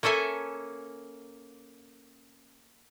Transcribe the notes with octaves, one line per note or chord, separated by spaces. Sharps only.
A#3 C#4 A4 E5 G#5